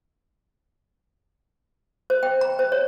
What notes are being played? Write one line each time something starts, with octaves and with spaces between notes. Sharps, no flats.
C5
G5
A#5
C5
C#5